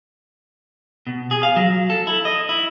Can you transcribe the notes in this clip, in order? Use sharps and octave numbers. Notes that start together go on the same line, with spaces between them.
B2
G#4
F5
F#3
A4
E4
D#5
E4